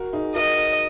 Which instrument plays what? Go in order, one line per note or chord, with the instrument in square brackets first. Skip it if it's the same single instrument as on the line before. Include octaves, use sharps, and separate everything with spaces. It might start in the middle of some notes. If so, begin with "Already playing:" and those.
Already playing: [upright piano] F#4 A#4
D#4 G#4
[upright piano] F#4 A#4 [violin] D#5